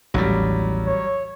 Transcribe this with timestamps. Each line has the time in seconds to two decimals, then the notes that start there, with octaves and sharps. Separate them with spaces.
0.14 A1 D#2 A2 F#3 G3
0.86 C#5